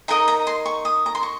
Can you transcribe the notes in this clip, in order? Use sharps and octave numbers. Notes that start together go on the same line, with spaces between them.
D#4 A#4 D#5 A#5
A#5
C6
C#6
D#6
A#5
C6
C#6